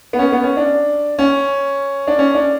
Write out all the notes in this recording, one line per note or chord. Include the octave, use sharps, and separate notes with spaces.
B3
C#4
B3
C#4
D4
C#4
D4
C#4
D4